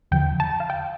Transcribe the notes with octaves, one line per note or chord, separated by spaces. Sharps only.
E2 D3 F3 G5
A5
F5
G5